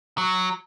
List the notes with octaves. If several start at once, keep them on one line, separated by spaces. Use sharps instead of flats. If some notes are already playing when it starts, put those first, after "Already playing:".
F#3